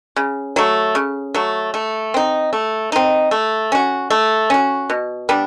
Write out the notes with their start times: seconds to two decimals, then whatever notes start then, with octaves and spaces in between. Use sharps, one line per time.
0.16 C#3
0.56 F#3 A3
0.95 C#3
1.34 F#3 A3
1.74 A3
2.14 C4 D#4
2.53 A3
2.92 C4 D#4
3.31 A3
3.72 C#4 F#4
4.10 A3
4.50 C#4 F#4
4.90 B2
5.29 G3 B3 D4